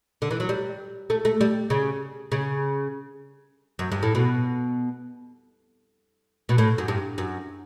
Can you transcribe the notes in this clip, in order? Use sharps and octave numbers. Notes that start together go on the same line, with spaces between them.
D3
E3
F#3
G3
A3
A3
G3
C#3
C#3
F#2
G2
A2
B2
B2
A2
F#2
G2
F#2